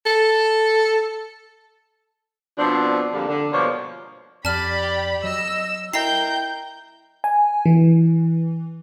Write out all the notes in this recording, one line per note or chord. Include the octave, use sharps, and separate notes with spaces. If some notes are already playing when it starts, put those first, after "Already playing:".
A4
B2 F3 C4 D4
F2 A#2 D3 F3 G3 A#3
D3
G2 B2 F3 A#3 C#5
F2 G4 D5 A5 B5 F6
F#3 D#5 E6
E4 A#4 D#5 G5 A#5 G6 C7
G#5
E3